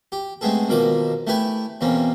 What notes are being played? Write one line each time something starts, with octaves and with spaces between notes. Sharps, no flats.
G4
G#3 A3 B3 C4 G#4 A4
B2 D#3 F3 A#3 D6
A3 E4 G4 B4 G#5
E2 B2 A#3 C4 C#4